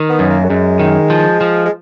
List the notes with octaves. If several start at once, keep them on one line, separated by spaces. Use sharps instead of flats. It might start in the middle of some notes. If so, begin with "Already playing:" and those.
Already playing: D#3
B3
F#2
A#3
F#3
F#2 G#3
D#3
F3
F3
G#3